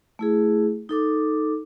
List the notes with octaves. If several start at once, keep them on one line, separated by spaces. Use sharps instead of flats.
A3 E4 G#4
D#4 A4 D6